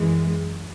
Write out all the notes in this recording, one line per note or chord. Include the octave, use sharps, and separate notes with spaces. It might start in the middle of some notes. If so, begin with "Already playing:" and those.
Already playing: F#2 E3 G#3